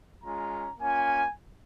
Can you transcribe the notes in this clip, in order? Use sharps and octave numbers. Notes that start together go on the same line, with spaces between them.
G#3 C#4 F4 A#5
A#3 C#4 F4 G#5